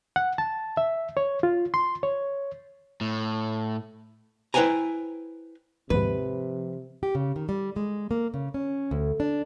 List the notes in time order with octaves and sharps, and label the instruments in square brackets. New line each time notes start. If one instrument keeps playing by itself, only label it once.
[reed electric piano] F#5
A5
E5
C#5
F4
C6
C#5
[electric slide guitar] A2
[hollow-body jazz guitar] E4 B4 C5 G5 G#5 A#5
[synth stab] D#2 G#2 [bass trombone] C3 [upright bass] F3 [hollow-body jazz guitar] B4
[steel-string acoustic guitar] G4
C#3
D#3
G3
G#3
A#3
C#3
C#4
D2
D4